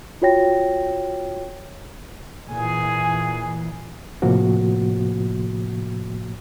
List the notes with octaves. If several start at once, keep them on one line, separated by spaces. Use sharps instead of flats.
F4 F#4 C#5 G5 A#6
A#2 E3 G#4 G#5
A2 C3 F3 A#3 F#4